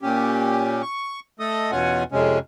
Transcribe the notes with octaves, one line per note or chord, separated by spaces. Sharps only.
A#2 C#4 G4
C#6
A3 A4 D#5 D#6
E2 B2 C#4 F4 F#5 G#5
F2 C3 G#3 C#4